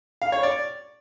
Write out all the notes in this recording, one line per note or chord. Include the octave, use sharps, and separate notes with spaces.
F5
C#5
D5